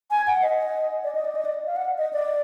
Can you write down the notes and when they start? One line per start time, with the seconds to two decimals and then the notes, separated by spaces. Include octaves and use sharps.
0.11 G#5
0.27 F#5
0.42 D#5
1.04 D5
1.15 D#5
1.25 D5
1.35 D#5
1.45 D5
1.67 F5
1.76 F#5
1.98 D#5
2.13 D5